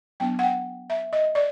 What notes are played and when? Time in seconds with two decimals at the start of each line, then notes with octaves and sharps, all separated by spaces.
0.20 F#3 B3 D4 G5
0.39 F#5
0.43 G5
0.90 E5
1.13 D#5
1.35 D5